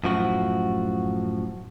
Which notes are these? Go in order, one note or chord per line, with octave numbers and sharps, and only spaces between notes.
F#2 A2 F3 F#4